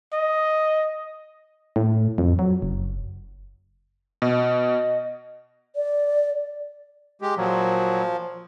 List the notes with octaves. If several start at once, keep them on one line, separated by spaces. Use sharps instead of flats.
D#5
A2
F2
F#3
F#1
B2 D#5
D5
G#3 G4
A#2 F3 F#3